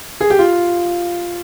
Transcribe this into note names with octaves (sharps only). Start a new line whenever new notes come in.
G#4
G4
F4